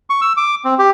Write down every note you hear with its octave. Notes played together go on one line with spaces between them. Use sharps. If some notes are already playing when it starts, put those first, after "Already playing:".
C#6
E6
D6
C4
G4